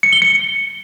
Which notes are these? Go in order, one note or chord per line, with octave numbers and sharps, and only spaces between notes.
C#7
G7
C#7